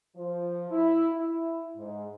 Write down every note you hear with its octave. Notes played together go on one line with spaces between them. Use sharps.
F3
E4
E4
G#2